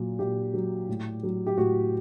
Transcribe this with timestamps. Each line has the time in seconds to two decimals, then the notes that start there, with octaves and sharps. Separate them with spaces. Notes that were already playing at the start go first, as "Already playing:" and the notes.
Already playing: A#2 F#3
0.19 A#2 G4
0.54 F#3
0.89 A2
1.23 F#3
1.47 G4
1.57 A2 F#4